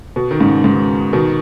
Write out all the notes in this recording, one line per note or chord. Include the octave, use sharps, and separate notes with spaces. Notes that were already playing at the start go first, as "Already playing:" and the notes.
B2
D#3
G#2 C#3
G#2 C#3
B2 D#3